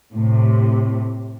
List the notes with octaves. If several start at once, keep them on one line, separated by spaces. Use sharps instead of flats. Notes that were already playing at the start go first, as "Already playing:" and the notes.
A2 C3